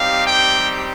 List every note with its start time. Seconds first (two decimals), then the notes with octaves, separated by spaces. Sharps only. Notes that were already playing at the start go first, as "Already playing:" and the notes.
Already playing: G3 C4 D#4 G4 F5
0.26 G5